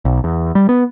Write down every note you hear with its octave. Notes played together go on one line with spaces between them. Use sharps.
B1
E2
G3
B3